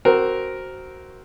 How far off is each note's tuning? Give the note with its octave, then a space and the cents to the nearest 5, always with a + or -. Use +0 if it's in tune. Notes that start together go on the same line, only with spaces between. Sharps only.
C4 +0 F#4 +15 A#4 +0